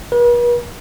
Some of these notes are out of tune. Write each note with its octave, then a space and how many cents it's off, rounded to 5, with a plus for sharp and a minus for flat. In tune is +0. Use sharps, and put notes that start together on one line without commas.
B4 -45